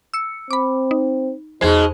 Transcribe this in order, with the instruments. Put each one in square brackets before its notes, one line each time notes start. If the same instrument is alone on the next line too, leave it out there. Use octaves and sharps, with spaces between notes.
[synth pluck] E6 C#7
[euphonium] C4 [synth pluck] B5 D6
[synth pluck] D#4
[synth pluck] E2 G#4 C5 [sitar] B2 G#3 [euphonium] D#4